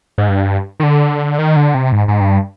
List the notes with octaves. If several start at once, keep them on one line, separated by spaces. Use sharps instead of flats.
G#2
G2
D#3
D3
D#3
D3
C3
G#2
G#2
G2